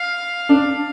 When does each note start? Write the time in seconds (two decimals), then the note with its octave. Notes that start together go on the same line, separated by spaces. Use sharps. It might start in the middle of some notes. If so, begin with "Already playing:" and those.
Already playing: F5
0.49 D4